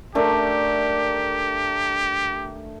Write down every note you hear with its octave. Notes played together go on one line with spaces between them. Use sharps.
A3 D4 G4 A#4